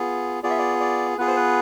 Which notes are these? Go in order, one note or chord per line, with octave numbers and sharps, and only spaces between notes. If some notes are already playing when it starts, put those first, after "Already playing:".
Already playing: B3 F4 G#4
B3 F4 G#4 D5
E5
D5
D5
B3 F4 G#4 B4
C5
B4